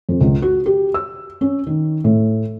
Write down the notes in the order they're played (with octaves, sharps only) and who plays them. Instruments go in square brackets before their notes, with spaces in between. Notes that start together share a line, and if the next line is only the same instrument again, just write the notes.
[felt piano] F2
C#2
F#4
G4
E6
C#4
D#3
A2